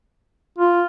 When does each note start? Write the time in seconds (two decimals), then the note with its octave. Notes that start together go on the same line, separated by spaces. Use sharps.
0.58 F4